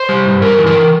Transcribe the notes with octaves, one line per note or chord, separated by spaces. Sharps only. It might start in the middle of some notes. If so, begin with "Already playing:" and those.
Already playing: C5
G3
G2
G2 A#4
E3
A#4
E3